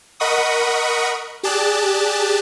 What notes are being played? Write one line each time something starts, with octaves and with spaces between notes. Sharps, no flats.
A#4 D#5 F#5 B5 C#6 D#6
G4 G#4 D5 A5 F#6